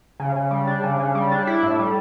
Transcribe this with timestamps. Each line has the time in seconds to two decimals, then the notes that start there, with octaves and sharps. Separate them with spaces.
0.20 C#3
0.36 C#3
0.51 G3
0.67 D4
0.84 C#3
1.00 C#3
1.15 G3
1.32 D4
1.47 E4
1.63 A2
1.79 G3